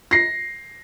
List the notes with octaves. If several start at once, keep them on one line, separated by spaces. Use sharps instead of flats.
A#6 C7